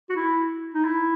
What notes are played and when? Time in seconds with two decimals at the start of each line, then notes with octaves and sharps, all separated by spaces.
0.10 F#4
0.16 E4
0.74 D#4
0.85 E4